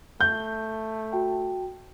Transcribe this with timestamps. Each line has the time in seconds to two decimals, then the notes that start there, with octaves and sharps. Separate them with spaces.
0.21 A3 G6
1.12 F#4 G5 A5